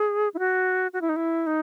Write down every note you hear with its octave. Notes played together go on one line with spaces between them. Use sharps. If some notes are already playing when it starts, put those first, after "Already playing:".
Already playing: G#4
E4
F#4
F#4
E4
D#4
E4
D#4